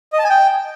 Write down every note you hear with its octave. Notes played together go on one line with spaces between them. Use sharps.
D#5
A5
G#5
G5